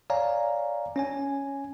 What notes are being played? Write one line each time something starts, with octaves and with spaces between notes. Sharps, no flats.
C#5 D5 F5 G#5 A#5
C#4 C#5 G#5